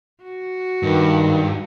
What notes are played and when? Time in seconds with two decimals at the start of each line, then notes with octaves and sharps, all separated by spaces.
0.23 F#4
0.83 G2 D#3